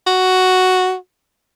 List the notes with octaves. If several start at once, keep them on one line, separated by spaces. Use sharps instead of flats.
F#4